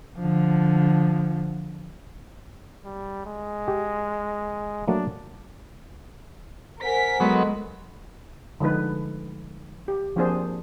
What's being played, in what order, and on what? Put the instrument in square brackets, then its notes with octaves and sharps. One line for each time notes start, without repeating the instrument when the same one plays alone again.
[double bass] D3 F3
[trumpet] G3
G#3
[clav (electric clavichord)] G4
[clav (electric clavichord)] F#3 A3 A#3 [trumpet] D4
[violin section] A#4 B6 [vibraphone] C5 F#5 G#5
[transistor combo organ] F#3 B3 [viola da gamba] G#3 [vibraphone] A4 D#5 C6
[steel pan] D3 F3 G#3 D#4 B4
G4
F3 A#3 C4 D4 G#4 C5